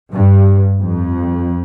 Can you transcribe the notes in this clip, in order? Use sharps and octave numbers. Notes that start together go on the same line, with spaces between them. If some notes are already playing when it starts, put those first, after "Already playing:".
G2
F2